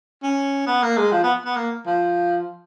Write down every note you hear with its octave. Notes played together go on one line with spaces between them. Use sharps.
C#4
B3
A#3
G#3
F3
B3
B3
A#3
F3